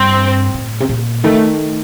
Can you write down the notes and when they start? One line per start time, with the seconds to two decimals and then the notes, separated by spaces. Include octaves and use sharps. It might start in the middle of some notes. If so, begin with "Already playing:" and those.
Already playing: G2 C4
0.54 A2
0.80 C3
0.89 A#2
1.23 D#3 A3